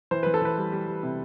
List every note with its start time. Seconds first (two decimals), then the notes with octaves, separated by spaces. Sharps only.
0.11 E3 C5
0.23 E3 B4
0.34 A4
0.42 E3 B4
0.57 G3
0.72 G3
0.87 G3
1.03 C3